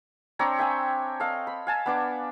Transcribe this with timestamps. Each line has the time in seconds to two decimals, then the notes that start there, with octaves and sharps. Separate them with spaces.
0.39 C4 D4 C#5 A#5
0.59 E5 G5 G#5
1.20 A4 D#5 F5
1.47 B5
1.67 F5 G#5 A5
1.86 B3 D4 D6